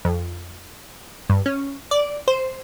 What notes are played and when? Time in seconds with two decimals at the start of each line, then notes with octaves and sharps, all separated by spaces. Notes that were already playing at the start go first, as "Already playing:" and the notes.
0.05 F2
1.30 G2
1.46 C#4
1.91 D5
2.28 C5